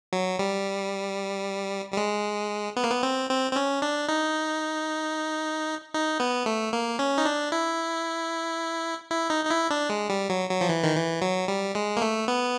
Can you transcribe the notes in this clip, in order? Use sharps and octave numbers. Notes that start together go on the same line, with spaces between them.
F#3
G3
G3
G#3
B3
A#3
B3
C4
C4
C4
C#4
D4
D#4
D#4
B3
A3
A#3
C#4
D#4
D4
E4
E4
D#4
D#4
E4
D4
G#3
G3
F#3
F#3
F3
E3
D#3
E3
F#3
G3
G#3
A#3
A3
B3